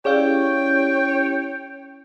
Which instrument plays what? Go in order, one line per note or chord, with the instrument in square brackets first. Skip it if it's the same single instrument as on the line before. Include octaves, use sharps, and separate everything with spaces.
[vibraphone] C#4 E4 G4 [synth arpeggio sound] G#4 D5 F5 [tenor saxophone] C#5 [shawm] G5